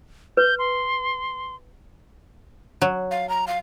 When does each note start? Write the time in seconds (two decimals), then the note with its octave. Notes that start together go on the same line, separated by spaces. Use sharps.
0.37 B4 G6
0.59 C6
2.82 F#3
3.11 F5
3.29 A#5
3.47 F5